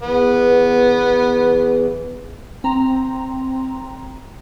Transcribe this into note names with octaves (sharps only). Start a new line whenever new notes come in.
E2 E3 B3
C4 A#5